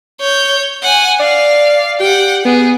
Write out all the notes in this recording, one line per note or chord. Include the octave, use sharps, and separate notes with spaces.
C#5 G6
F#5 G#5
D5 F5
G4 F#5 G5
B3 G#4